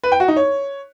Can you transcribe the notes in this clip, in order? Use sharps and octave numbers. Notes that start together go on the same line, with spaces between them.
B4
G5
F#4
D#4
C#5